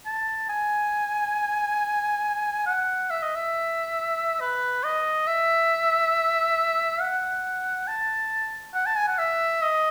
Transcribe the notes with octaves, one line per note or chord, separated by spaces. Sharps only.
A5
G#5
F#5
E5
D#5
E5
B4
D#5
E5
F#5
A5
F#5
A5
G#5
F#5
E5
D#5